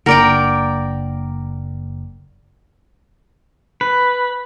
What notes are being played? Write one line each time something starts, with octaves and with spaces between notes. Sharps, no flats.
F#1 A#3 D4 A#4 D5 F#5 G5 A#5
B4